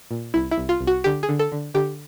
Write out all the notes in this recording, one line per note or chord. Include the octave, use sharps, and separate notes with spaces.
A#2
C2 E4
E4
C2
F4
C2
F#4
D3 G4
G#4
D3
A4
D3
D3 G4